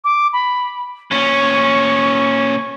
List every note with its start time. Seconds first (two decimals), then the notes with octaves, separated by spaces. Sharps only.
0.04 D6
0.33 B5
1.11 A#2 C#4 C#6